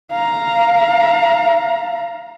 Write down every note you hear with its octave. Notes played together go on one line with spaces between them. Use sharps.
F5 A#5